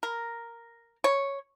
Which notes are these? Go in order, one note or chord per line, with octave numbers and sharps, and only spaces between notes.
A#4
C#5